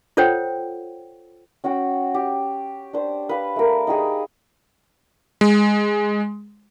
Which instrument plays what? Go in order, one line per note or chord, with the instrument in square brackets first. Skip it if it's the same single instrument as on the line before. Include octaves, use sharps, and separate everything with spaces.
[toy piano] F4 A4 C5 C#5 F#5 G5
[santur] C#4 F#4 F#5 G5
G4
D4 C5
B4 F5
A3 A#4
D#4 G4 G#4 B5
[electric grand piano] G#3